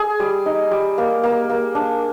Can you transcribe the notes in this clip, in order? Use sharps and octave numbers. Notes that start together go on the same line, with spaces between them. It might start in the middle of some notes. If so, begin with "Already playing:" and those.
Already playing: G#4
G3
D#4
G3
A#3
A#3
A#3
D4